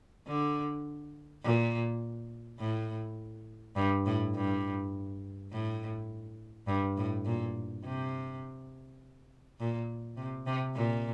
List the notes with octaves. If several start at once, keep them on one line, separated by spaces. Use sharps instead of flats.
D3
A#2
A2
G2
A2
G2
A2
G2
A2
A#2
C3
A#2
C3
C3
A#2